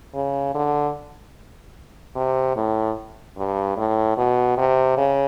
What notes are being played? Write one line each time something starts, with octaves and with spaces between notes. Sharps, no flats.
C#3
D3
C3
A2
G2
A2
B2
C3
C#3